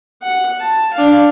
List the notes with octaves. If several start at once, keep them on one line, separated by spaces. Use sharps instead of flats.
F#5
A5
D4 F5